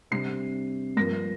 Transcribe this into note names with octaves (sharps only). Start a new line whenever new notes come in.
C3 G3 D4 C7
G2 F3 A#3 A#6